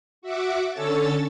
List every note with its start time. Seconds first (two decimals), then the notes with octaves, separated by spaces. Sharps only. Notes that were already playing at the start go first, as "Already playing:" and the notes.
0.22 F#4 E5 F#5 D6
0.72 D3 C#4 A4 C#5 E6 A6